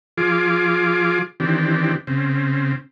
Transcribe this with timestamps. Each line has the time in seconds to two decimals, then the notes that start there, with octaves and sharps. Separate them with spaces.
0.18 F3 F4 G#4 D6
1.40 D#3 E3 C4 D4 G4
2.07 C#3 C4